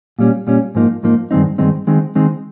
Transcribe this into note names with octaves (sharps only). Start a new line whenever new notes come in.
A#2 G3 C#4
A#2 G3 C#4
G#2 F3 A#3 D#4
G#2 F3 A#3 D#4
G2 D#3 G#3 C4 D#4
G2 D#3 G#3 C4 D#4
D#3 G#3 C4 D#4
D#3 G#3 C4 D#4